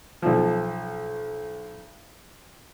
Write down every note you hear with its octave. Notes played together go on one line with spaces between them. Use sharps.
B1 F3